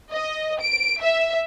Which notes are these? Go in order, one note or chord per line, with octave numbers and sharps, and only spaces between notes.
D#5
D7
E5